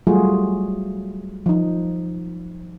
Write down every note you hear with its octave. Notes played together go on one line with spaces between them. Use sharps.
F#3 G3 A3 F4 F#4 G#4
F3 D#4